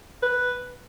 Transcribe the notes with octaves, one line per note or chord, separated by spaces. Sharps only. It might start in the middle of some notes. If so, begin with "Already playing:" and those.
B4